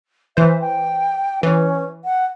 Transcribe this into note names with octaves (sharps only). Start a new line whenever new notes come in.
E3 C5 E5
G5
E3 C#4
F#5